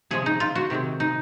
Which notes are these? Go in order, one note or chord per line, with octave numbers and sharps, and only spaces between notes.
C3 F3 G#3 C#4 G#4
D#4
F4
F#4
C3 D#3 G#3 C4
D#4